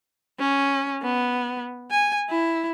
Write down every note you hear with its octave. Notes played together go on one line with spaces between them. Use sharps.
C#4
B3
G#5
E4